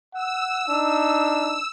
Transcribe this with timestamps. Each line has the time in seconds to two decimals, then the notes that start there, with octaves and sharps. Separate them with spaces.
0.14 F#5 E6
0.68 D4 D#4